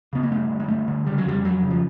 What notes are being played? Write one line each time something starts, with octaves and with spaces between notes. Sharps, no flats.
C#3 B3
A#3
G2 A3
D3
G#3
G2 A3
D3
C#3 G3
F#3
F2 G3
F2 F#3
C#3
F3